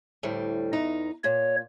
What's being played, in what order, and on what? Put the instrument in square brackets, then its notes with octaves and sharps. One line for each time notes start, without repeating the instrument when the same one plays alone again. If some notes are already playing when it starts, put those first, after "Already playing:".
[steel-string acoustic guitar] D2 A2 G3
E2 D#4 A#5
[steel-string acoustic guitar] A#2 [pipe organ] C#5